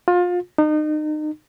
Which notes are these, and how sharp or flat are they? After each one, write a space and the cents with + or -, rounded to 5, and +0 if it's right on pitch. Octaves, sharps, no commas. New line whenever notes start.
F4 +30
D#4 -30